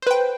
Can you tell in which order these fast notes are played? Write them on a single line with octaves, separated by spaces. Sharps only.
C5 B4 G5